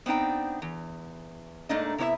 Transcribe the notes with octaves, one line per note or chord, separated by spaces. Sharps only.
B3 C4 D4 D#4 G5
E2
G#2 A3 A#3 D4 D#4 D#5
C3 B3 E4 C#5 E5